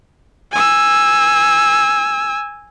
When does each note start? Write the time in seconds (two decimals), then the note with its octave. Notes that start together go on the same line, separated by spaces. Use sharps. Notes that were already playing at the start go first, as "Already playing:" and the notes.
0.52 G#5 E6